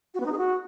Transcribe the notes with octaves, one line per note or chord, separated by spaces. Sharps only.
F#4
B3
D#4
G#4
F#4